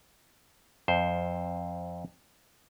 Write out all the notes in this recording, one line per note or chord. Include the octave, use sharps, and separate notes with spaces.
F2 C5